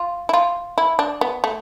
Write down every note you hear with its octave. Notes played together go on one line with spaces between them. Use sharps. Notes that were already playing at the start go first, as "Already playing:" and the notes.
Already playing: F4
E4
F4
E4
D4
B3
A3